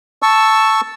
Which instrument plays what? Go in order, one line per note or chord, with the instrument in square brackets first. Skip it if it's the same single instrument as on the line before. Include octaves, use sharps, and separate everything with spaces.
[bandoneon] A5 C#6 E6